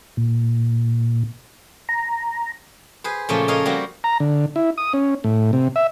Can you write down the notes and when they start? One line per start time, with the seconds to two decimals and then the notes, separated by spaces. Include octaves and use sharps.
0.17 A#2
1.89 A#5
3.04 G#4 B4 C5
3.29 A#2 C#3 F3 A3 C#4 F4
3.48 F4 A4 A#4 C#5 D#5 F5
3.66 G3 A#3 C4 F#4
4.04 A#5
4.20 D3
4.56 E4
4.78 D#6
4.93 C#4
5.24 A2
5.53 C3
5.76 E5